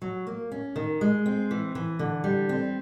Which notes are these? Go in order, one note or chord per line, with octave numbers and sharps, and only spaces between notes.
F#3
A#3
C#4
D#3
G#3
C4
E3
E3
D3
G3
C4